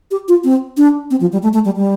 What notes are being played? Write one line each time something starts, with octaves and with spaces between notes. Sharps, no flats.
G4
F4
C4
D4
C4
F3
G3
A3
A3
G3
G3